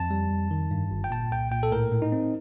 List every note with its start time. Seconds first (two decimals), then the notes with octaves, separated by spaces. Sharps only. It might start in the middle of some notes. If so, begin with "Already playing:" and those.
Already playing: F2 A5
0.11 G3
0.31 F2
0.51 D#3
0.71 G2
0.91 G1
1.04 G5
1.11 A#2 A5
1.31 C2 G5
1.51 A#2 G5
1.63 A4
1.72 A2 A#4
1.92 A2
2.02 D#4
2.12 C4